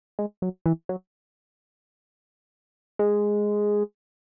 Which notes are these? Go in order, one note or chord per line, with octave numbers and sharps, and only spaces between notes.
G#3
F#3
E3
F#3
G#3